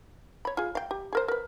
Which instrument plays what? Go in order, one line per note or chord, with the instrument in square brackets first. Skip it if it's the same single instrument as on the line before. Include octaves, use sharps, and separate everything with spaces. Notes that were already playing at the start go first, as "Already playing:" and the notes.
[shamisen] C#5 B5
F4 G#4
F5 G5
G4
G#4 A#4 C5
A#4 B4